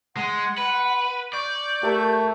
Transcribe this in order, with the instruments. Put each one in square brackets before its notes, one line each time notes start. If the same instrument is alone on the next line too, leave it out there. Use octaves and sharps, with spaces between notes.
[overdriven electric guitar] G#3 [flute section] F#5 C6
[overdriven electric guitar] B4
[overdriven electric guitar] D5 [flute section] C#6 G6
[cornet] A3 [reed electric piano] G4 A#4